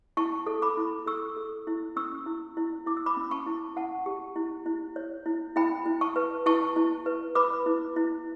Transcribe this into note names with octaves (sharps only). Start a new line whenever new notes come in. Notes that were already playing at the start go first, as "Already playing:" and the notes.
E4 A5 C#6
A4
B5 D6
E4
A4 C#6 E6
A4
E4
C#4 C#6 E6
E4
E4
E4 D6
E6
B5 D6
C#4
A5 C#6
E4
E4 F#5 A5
G4
E4
E4
C#5
E4
E4 G5 B5
E4
A5 C#6
B4
E4 A5 C#6
E4
B4
B4 B5 D6
E4
E4